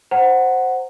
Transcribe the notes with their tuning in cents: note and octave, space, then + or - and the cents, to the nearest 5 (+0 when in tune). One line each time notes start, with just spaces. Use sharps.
C5 +0 F#5 +0 A#5 -25